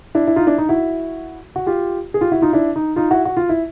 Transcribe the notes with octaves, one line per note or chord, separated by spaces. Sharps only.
D4 E4
E4
D#4 F4
D4 E4
D#4
E4 F#4
F#4
F4 G4
G#4
F4 G4
E4 F#4
D#4 F4
D4 E4
D#4
D#4 F4
E4 F#4
F#4
F4
E4